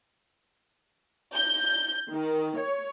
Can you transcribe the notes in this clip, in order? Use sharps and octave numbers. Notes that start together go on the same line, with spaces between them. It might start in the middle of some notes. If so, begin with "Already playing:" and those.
G6
D#3
C#5